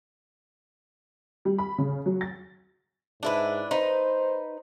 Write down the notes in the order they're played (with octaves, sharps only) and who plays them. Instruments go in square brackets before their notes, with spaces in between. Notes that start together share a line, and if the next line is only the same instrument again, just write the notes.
[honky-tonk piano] G3
B5
C#3
F#3
A6
[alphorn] G#2 [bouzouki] D4 E4 B4
[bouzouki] D#4 B4 [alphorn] C5